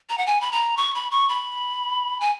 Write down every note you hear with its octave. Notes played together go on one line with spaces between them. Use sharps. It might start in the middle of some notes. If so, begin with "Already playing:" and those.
A#5
F#5
G#5
B5
A#5
C#6
B5
C#6
B5
G#5